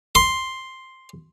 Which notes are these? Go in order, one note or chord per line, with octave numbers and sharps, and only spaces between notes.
C6